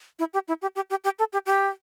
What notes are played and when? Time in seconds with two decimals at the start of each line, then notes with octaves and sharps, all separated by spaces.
0.19 E4
0.34 G4
0.48 E4
0.62 G4
0.76 G4
0.90 G4
1.04 G4
1.19 A4
1.33 G4
1.46 G4